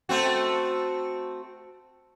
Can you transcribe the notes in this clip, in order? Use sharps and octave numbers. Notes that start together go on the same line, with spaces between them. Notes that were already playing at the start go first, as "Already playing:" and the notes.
A3 C4 F#4